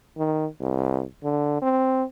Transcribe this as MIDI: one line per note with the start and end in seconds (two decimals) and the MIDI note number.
0.18 0.46 51
0.61 1.02 36
1.24 1.58 50
1.62 2.04 60